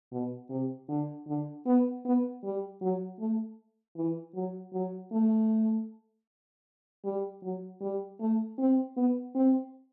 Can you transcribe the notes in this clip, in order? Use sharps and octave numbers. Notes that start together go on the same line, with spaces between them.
B2
C3
D3
D3
B3
B3
G3
F#3
A3
E3
F#3
F#3
A3
G3
F#3
G3
A3
C4
B3
C4